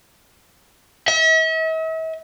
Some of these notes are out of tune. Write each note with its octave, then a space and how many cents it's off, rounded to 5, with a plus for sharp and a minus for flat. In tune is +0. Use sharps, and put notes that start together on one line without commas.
E5 -45